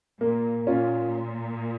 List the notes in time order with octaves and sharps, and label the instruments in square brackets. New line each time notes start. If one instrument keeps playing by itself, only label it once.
[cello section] A#2 [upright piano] A#3
[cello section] A#2 [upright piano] C#4 F4